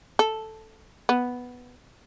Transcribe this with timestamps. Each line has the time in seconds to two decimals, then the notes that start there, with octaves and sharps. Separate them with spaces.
0.19 A4
1.09 B3